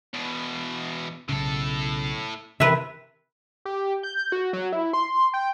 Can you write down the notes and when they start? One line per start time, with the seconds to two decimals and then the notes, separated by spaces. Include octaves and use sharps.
0.14 E2 B2
1.29 B1 A2 C#3 A4
2.60 C3 D#3 E3 A#4 B4 E5
3.65 G4
4.03 G6
4.32 F#4
4.53 F#3
4.73 E4
4.93 C6
5.34 G5